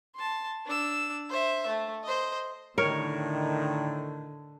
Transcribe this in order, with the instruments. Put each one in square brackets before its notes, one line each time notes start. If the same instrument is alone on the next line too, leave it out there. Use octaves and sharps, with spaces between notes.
[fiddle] A5 C6
D4 E6
C5 E5
A3
C5 D#5
[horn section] A2 D#3 [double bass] D3 [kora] A#4 C#5